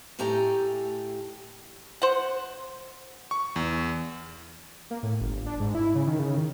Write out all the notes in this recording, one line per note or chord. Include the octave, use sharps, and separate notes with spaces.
A2 A3 G4 A4 G#5 A#5
C5 F#5
C#6
E2
A#3
A2
G1
D4
G#2
E4
C#3
D#3
C#3
D#3